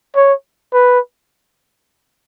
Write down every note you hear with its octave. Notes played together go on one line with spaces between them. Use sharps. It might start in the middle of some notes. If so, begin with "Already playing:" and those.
C#5
B4